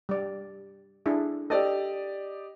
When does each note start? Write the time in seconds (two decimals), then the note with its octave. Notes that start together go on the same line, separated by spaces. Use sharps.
0.09 G3 D5
1.06 D4 E4 G#4
1.50 G4 A4 D5 D#5